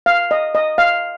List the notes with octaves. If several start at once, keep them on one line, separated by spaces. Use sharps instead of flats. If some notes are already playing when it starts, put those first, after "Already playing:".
F5
D#5
D#5
F5